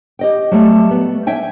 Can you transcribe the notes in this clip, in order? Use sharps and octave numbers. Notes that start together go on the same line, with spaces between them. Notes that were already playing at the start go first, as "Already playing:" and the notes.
G4 D#5 G5
F#3 G3 A3
B3
E5 G5 G#5